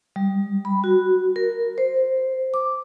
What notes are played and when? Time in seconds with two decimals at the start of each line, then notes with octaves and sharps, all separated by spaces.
0.16 G3
0.65 B5
0.84 F#4
1.36 A#4
1.78 C5
2.54 D6